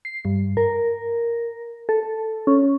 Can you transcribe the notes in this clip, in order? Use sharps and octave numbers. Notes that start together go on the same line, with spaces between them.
C7
G2
A#4
A4
C#4